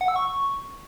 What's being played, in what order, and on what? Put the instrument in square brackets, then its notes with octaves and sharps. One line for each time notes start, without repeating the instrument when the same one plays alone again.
[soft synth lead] F#5
E6
C#6